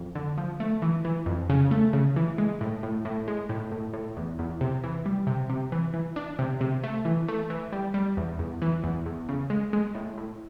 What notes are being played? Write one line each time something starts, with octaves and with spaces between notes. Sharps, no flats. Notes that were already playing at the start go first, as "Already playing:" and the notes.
Already playing: F2
D3
F3
A3
E3
E3
F2
C#3
A3
C#3
E3
G#3
A2
A2
A2
G#3
A2
A2
A2
E2
E2
C3
E3
G3
C3
C3
E3
E3
D4
C3
C3
A3
E3
A3
E3
G3
G3
E2
E2
E3
E2
E2
C#3
G#3
G#3
A2
A2